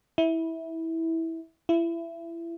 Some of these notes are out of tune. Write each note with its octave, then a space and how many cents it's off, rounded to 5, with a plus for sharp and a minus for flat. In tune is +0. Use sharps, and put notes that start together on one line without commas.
E4 -15
E4 +25